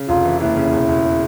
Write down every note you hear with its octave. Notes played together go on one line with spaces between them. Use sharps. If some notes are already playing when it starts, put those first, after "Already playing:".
Already playing: C#3
F1 F4
E3
D#2 E4
C#3
E1
E1